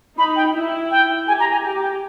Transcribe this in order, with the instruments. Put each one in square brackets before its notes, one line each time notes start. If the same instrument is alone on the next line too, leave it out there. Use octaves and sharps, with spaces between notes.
[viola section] D#4 [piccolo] B5
[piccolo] G5
[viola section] E4
[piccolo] G5
[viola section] G4 [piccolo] G#5
[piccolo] A#5
G#5
[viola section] G4 [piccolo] G5
[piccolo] G5